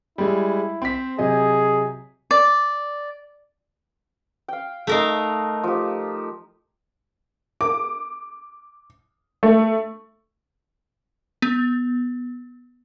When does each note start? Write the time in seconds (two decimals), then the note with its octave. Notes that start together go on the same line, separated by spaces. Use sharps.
0.18 G3 G#3 E4
0.82 C4 C5 B6
1.18 C3 F#3 G#4 D#5
2.31 D5
4.48 F5 G5
4.87 A3 D#4 A#4 F5 A5
5.63 F3 G4
7.61 D6
9.43 A3
11.42 B3